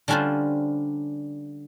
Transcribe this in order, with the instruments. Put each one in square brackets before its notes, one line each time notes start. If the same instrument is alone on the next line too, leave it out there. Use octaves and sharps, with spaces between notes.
[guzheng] D3 G3 C#4 D4 F4 C5